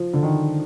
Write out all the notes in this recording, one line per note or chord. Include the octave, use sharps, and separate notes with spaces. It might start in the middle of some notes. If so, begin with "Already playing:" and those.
Already playing: F3
D3
D#3